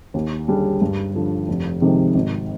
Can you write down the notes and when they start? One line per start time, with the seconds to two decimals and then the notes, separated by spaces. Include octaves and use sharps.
0.14 D#2
0.48 D3 G3 D4 G#4
0.81 G2
1.14 D3 F3
1.48 F1
1.81 F2 C3 D#3 G#3
2.15 G#1